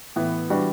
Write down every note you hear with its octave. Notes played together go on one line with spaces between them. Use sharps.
A2 E3 B3
E3 G3 D4 F#4